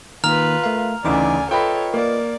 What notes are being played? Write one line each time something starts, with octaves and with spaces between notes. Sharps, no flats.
D#3 A#3 F4 B4 A#5 F6 F7
A3 A#4 F5
D2 C#3 E3 D#4 D5 G#5 D6
F4 A4 B4 C#5 D#5 G5 B5
A#3 D5